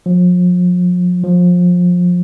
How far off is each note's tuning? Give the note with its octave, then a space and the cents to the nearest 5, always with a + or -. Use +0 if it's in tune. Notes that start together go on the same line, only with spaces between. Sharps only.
F3 +40
F3 +25